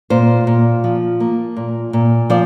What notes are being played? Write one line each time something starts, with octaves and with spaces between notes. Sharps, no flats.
A#2 C5
A#2
F3
A#3
A#2
A#2
F3 D5